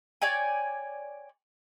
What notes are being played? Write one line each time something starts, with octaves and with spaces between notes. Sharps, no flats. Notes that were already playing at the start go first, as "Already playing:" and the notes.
C#5 D5 G5 G#5